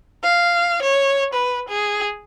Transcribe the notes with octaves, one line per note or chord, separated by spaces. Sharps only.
F5
C#5
B4
G#4